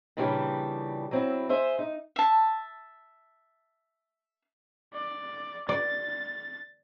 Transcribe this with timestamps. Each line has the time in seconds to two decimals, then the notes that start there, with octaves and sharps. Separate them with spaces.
0.17 A#2 C#3 E3 G3 D4 G4
1.11 F#3 C4 E4
1.49 G#4 C5 E5
1.79 D#4
2.16 E5 A5
4.94 D5
5.69 D5 A6